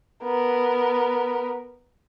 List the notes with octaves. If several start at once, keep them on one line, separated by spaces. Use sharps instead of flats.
B3 A#4